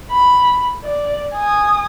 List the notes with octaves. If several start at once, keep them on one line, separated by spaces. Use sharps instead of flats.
B5
D5
G#5 D#6